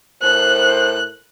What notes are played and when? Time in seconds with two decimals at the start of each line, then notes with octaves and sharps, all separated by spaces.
0.22 A2 A#4 C5 F#6